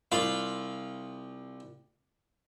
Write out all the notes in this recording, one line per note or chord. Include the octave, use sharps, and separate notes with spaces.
C2 F4 F5 B5